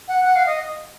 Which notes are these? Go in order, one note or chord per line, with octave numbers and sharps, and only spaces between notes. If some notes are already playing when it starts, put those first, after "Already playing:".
F#5
F#5
F5
D#5